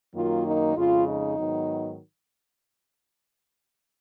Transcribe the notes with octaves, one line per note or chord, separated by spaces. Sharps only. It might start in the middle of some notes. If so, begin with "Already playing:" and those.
F#2 D#3 F#3 A#3 F4
D#4
F2 C#3 G#3 F4
D#4
G#2 D#3 F#3 B3